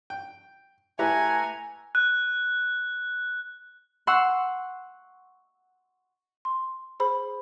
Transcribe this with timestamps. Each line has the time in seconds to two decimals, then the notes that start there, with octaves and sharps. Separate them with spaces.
0.10 G5
0.99 A3 E4 G4 B4 F#5 G#5 A#5
1.95 F#6
4.07 F#5 C6 C#6 E6
6.45 C6
7.00 G#4 C5 B5